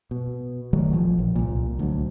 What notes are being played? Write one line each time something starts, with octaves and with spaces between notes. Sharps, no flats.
B2
D#3 F#3 G3 A3
A1 F3
A#1
C2 A#2
D2 F#3